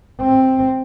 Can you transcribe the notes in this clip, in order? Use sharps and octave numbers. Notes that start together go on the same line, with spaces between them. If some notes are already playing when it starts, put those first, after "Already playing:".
C4